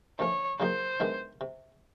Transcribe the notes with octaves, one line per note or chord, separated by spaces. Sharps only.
D2 C3 F3 A3 C#4 C#5
C#3 F#3 A#3 D#4 G4 C5
C3 D#3 G#3 B3 D4
C3